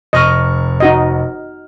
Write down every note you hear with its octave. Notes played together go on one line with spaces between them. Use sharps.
F1 D#5 C#6 F6
D#4 F#4 D#5